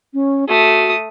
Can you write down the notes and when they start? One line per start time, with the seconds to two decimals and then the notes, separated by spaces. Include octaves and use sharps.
0.14 C#4
0.49 A3 F#4 D#6